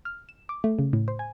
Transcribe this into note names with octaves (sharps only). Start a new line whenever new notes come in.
F6
E7
D6
A3
C#3
A2
C5
G#5